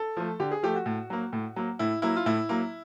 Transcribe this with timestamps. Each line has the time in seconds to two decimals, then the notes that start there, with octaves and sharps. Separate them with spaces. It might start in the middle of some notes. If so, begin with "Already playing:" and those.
Already playing: A4
0.17 F3 A3
0.40 D3 G4
0.51 G#4
0.63 F3 A3 G4
0.75 F#4
0.86 A2
1.10 F#3 A#3
1.33 A2
1.56 F#3 A#3
1.79 A2 E4
2.02 F#3 A#3 E4
2.16 F4
2.26 A2 E4
2.49 F#3 A#3